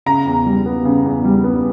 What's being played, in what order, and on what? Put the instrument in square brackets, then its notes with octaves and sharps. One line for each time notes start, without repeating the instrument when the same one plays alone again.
[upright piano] C#3 A#5
E2
G3
B3
C#3
E2
G3
B3